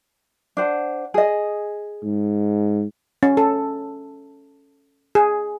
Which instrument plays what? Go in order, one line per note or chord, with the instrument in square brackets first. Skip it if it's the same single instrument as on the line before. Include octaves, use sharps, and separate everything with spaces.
[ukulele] D4 C5 F#5
G#4 D#5
[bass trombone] G#2
[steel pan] C#4
A4
G#4